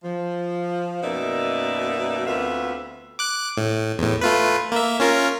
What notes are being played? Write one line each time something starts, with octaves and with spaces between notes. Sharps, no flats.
F3
F#2 B2 A#3 D#4 D5 E5
D2 B3 C4 F4 E5
D6 F#6
A2
E2 A2
A3 F4 B4
A#3 E5
C#4 F4 A#4